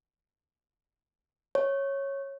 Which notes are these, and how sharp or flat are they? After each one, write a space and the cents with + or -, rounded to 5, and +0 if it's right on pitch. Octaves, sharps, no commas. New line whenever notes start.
C#5 -10